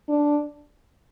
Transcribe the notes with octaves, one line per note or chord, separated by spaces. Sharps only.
D4